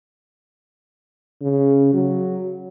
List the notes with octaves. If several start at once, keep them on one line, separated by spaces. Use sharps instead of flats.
C#3
F#3